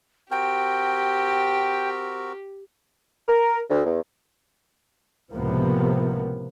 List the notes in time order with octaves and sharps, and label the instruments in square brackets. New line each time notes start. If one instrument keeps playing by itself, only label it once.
[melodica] C4 F#4 A#4 [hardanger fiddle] G4 [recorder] G5
[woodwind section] A#4
D2
E2
[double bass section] C#2 A2 C3 F3 A#3 B3